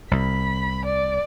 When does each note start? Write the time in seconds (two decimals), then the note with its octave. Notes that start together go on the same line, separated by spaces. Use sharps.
0.11 C2 B5
0.85 D5